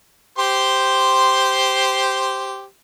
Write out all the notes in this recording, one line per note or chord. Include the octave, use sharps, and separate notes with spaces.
G4 C5 C6